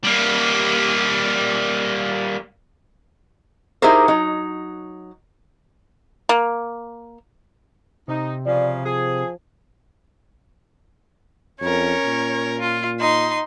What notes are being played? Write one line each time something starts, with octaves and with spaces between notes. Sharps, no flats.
G3 A#3
D#4 E4 G4 G#4 A#4 C5
F#3 D#4
A#3
C3 D#4
C#3 F3 D5
F3 G#4
F2 C#4 A#4 C#5
A#2
F4
D#4 C6